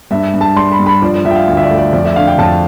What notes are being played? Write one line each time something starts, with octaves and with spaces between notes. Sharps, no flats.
G2 E5
G2
A5
G3 C6
B5
G2
B5
F3 D5
D5
F3 E5
G5
F5
D2 F5
E5
D5
A3
D5
F2 D5
E5
D3 F5
G5
F2 A5